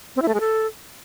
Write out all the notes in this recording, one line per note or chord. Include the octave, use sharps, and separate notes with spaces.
C4
E4
A3
G#3
A4